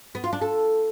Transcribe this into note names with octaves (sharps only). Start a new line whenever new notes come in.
B3
F4
D4
A4